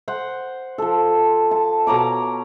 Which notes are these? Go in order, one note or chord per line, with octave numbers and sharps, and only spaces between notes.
C5 F#5
F3 A4
A5
B2 C#5 A#5 D6